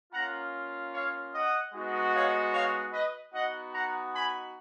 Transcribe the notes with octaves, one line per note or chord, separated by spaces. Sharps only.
A#3 C#4 F4 F#5 A#5
C#5 F5
D#5 F#5
G#3 B3 D#4 F#4
C#5 F5
C#5 F5
B4 D#5
B3 D#4 F#4 D#5 F#5
F#5 A#5
G#5 B5